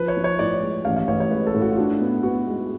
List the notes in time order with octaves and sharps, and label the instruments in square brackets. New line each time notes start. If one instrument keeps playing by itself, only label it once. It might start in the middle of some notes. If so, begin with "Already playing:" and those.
Already playing: [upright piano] F3 [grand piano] B4
[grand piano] C#5
[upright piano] F3
[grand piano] C#5
[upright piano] A2 [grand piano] D5
[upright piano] G#3
[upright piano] A1 [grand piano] F5
[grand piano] F5
[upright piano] A1 [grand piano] C#5
[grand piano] C#5
[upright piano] G#3 [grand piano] B4
[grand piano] A4
[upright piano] A2
[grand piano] F#4
F4
[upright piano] D4 [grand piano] F#4
[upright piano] B3
[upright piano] B3 [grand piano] F#4
[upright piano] G#3